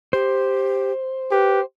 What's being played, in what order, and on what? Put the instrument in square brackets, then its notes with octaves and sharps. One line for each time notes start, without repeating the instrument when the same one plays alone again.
[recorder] G4 [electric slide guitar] C5
[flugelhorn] G4 [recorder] B4